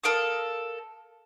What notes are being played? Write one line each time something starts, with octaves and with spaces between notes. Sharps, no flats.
A4 A#4 F5 D#6